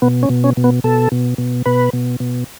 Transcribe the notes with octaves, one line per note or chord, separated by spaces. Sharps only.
B2 B3
C#4
B2
C#4
B2
B3
B2 A4
B2
B2
B2 B4
B2
B2